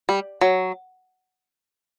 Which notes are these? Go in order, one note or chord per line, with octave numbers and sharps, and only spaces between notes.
G3
F#3